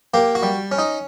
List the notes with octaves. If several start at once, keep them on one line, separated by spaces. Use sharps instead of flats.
A#3 G4
F#4
G3
C#4
D#4